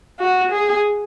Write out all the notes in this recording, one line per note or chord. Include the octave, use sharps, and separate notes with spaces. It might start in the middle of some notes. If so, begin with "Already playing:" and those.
F#4
G#4